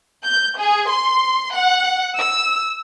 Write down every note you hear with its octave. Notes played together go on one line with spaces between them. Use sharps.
G6
G#4
C6
F#5
E6